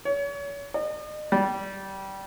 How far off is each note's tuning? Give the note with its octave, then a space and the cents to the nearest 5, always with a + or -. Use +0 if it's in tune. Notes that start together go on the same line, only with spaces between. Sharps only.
C#5 +35
D#5 -40
G3 -20